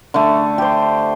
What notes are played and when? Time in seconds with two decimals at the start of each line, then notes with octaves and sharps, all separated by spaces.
0.14 D3 A3
0.58 G4 C5